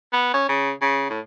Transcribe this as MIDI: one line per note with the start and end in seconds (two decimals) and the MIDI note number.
0.13 0.30 59
0.34 0.48 61
0.49 0.72 49
0.82 1.06 49
1.10 1.20 45